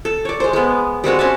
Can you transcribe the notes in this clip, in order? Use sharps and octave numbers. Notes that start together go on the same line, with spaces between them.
A4
C#5 D5
G#3 C5
G#3 B3
G3 G#3 C4 F#4
C#4 F#4 E5 A5